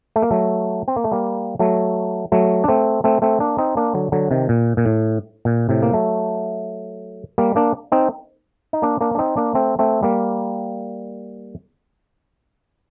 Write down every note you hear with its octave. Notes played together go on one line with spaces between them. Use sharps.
A3
A#3
F#3 A3
C4
A#3
A3
G3 A#3
F#3 A3
F#3 A3
D4
A3 C4
A3 C4
A3 C4
A#3 D4
C4 D#4
A#3 D4
D3 F#3
D3 F#3
C3 D#3
A#2
A#2
A2
A#2
A2 C3
A#3
F#3 A3
G3 A#3
A#3 D4
C4 D#4
D#4
A#3 D4
A#3 D4
D4
C4 D#4
A#3 D4
A3 C4
A3 C4
G3 A#3